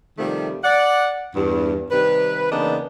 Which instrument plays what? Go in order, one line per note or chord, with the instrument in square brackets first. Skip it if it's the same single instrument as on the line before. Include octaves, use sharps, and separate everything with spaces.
[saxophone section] C3 D#3 F3 G3 A3
D5 F#5
E2 G2
C3 D#3 G3 B4
C#3 E3 A#3 B3 D4 D#4